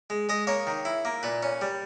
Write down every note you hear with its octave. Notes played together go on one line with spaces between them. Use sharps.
G#3
G#3 D#5
A#3 C#5
D#3
E4
A#3
A#2 B4
C#4
G3